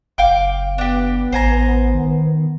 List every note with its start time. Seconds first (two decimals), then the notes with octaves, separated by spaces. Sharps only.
0.18 F#1 F5 G5 D6
0.78 B3 D4 G4
1.32 A1 C5 G#5 A#5
1.94 D#3